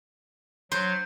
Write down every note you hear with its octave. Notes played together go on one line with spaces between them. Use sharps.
F#3 C5